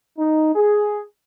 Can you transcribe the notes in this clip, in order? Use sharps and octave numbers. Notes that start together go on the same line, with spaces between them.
D#4
G#4